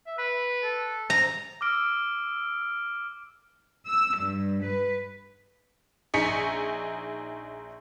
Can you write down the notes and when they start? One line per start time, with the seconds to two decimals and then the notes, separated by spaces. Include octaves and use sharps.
0.06 E5
0.18 B4 B5
0.63 A4
1.10 A#5
1.61 D6 E6 F6 D7
3.88 E6
4.20 G2
4.64 B4
6.14 A#1 D#4 G#4 C#6 B6 C#7